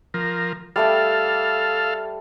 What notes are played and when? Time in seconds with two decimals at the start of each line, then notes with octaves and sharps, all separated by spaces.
0.14 F3 A#4
0.76 G3 A3 A4 F5 G5